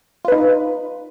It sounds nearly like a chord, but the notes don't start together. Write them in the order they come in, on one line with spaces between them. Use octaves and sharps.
F4 B4 D#4